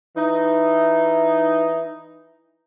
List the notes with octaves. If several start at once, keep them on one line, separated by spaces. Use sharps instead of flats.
E3 D#4